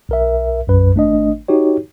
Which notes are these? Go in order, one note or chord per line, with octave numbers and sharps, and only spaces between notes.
B1 A#4 E5
B1 F#2 B4
G#1 A3 D4 D#5
D#4 F#4 G4 C#5